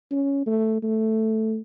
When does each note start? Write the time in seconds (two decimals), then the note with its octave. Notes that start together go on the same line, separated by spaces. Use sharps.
0.11 C#4
0.47 A3
0.83 A3